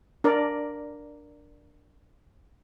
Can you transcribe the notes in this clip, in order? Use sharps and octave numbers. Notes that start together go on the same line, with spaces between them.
D4 A#4 D5